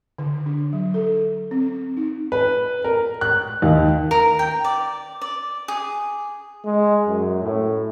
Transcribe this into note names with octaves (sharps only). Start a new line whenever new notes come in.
D3
D4
F#3
A4
C4
D#4
B4
A#4
F#6
D#2
A#4
G5
D5
D5
G#4
G#3
F#2
A2